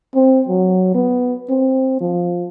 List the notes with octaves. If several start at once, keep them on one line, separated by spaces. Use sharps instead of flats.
C4
F#3
B3
C4
F3